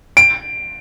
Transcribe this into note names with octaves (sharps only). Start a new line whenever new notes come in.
D7